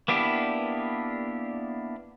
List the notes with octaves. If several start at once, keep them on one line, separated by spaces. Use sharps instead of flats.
A#3 B3 D4 E4 G4